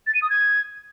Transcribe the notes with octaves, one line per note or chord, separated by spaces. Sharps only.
A6
D#7
D#6
G#6